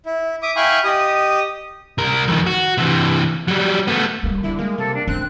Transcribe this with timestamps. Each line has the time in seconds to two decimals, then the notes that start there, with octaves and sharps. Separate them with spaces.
0.06 E4
0.43 E5 D6 D#6
0.56 E4 F5 G5 G#5 B5 C#6
0.84 G4 D#5 D#6
1.98 C2 A#4
2.28 F2 D#3
2.46 F#4
2.78 C3 E3
3.48 F#3 G3
3.88 A3 B3
4.23 D1 G3 A#3
4.44 D3 E4
4.59 G#3 A#3
4.78 C3 A4
4.95 D4
5.07 C4 D4 F#6